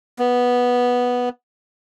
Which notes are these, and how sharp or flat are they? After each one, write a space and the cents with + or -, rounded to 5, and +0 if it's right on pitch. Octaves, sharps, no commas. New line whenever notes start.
B3 -5